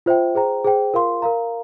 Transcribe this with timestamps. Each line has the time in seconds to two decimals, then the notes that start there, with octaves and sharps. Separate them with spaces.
0.06 F4 C5 E5 G5
0.35 G#4 C5 G5 A#5
0.64 G#4 C5 G5
0.94 F4 A#4 F5 C6
1.22 A#4 F5 A#5